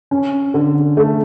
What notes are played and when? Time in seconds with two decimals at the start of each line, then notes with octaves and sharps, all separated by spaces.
0.11 C#4
0.54 D3
0.97 A3